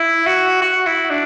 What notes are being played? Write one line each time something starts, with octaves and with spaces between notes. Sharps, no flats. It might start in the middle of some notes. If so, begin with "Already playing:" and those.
Already playing: E4
F#4
F#4
E4
D4